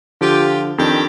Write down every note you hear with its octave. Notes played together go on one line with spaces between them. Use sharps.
D3 F3 F4 G4
F2 D#3 D4 G4